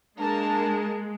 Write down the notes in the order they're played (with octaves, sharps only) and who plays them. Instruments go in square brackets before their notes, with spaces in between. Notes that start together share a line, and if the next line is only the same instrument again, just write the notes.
[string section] G#3 [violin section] A#3 A#4 A5 [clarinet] D4